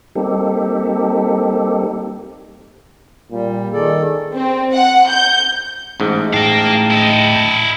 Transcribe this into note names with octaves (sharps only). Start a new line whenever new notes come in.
G3 A#3 C4 D#4 G4 A4
A#2 G3
D#3 G#4 A4 D5
C4
F#5
G6
A1 G#2
A2 A#4 F5 G5 A5
E4 D#5